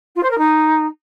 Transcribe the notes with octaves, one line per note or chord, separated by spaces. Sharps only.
F4
C5
A#4
D#4